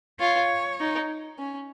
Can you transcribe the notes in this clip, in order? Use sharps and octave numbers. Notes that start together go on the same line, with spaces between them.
F4 C#5
D#4
C#4